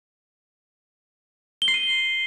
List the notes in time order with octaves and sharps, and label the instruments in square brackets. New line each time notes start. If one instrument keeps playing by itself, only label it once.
[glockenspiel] G7
C7
D#7